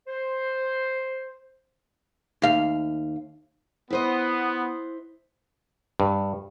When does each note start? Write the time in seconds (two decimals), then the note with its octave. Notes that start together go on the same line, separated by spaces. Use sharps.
0.07 C5
2.42 D#2 F5
3.90 B3 E4 C5 D#5
6.00 G2